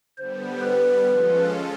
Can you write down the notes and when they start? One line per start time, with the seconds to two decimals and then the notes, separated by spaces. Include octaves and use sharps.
0.17 D3 G3 B3 C5
0.62 B4
1.07 F3 G#3 C#4 F4 A4